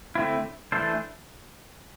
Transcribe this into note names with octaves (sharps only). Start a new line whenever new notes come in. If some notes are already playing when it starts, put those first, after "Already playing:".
D3 A3 C4 E4
E3 A3 D4 A4 C5